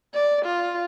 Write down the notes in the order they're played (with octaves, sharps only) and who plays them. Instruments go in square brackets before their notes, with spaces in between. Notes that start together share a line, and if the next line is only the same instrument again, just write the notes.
[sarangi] D5
F4